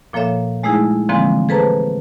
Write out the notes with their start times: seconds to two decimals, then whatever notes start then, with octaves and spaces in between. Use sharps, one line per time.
0.13 A#2 F3 A#3 A4 C#5 E5
0.63 G#3 A3 D#4 E4 G#4
1.09 D3 E3 F3 G#3 A#3 C4
1.49 G#4 A4 B4 C5 A5 A#5